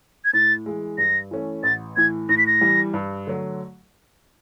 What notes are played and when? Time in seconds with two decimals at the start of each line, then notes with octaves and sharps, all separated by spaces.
0.25 G#6
0.33 A2 A6
0.66 E3 G#3
0.98 G2 A#6
1.31 E3 A3 C#4
1.63 A1 A6
1.97 A2 E3 G#6
2.29 A2 A#6
2.38 B6
2.47 A#6
2.61 E3 G3
2.94 G2
3.27 D3 F#3 A3